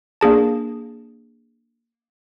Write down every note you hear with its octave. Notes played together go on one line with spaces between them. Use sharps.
A#3 D4 G#4 A5